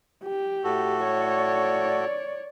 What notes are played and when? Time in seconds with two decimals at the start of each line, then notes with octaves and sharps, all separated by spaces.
0.24 G4
0.64 A2 F#4 A4
1.05 C#5 D5